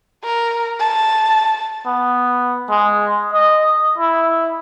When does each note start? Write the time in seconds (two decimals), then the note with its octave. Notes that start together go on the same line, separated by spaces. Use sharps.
0.24 A#4
0.80 A5
1.86 B3
2.70 G#3
3.34 D#5
3.98 E4